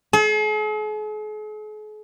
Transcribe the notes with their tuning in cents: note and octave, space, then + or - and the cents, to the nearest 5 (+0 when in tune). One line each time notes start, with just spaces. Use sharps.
G#4 +45